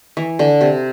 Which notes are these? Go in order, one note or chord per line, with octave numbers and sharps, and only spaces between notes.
E3
D3
C3